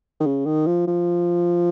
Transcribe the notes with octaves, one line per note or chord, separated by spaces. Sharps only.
D#3
C#3
D#3
F3
F3